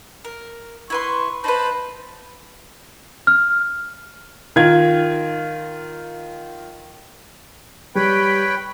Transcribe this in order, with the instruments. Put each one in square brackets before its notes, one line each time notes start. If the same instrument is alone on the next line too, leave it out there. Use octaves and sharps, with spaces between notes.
[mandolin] A#4
[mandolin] E4 B4 C6 [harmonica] C#6
[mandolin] D#4 B4 [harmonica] C5 A5 B5
[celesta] F6
[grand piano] D#3 F4 G#6
[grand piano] G3 [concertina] B4 C#5 [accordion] G5 B5